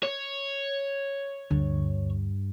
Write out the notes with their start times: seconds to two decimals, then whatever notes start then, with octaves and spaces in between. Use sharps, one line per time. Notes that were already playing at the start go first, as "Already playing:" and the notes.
0.03 C#5
1.51 D2 G2 D3